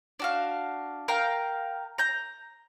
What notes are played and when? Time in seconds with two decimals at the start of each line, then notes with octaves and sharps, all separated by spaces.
0.20 D4 F#4 F5
1.08 A#4 F5 G5 A#5
1.98 A#5 G6